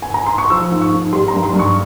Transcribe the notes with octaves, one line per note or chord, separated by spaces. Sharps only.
G#5
A#5
C6
C#6
F3 E6
G#2
C#6
G#2
G3 C6
A#5
G2
C6
G2
C#6